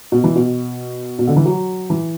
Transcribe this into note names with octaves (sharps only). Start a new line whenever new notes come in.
B2
E3
B2
B2
D3
E3
F#3
E3